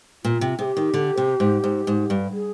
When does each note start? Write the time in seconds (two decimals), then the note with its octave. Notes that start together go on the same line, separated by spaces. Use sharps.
0.24 A#2 F4
0.41 C3
0.59 C3 G#4
0.64 G4
0.77 D#3
0.94 D3
1.17 C3
1.40 G#2
1.64 G#2
1.87 G#2
2.10 G2
2.33 G#4